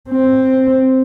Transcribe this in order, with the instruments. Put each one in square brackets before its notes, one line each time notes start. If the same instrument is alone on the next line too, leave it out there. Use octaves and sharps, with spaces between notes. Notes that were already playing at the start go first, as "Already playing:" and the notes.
[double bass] C4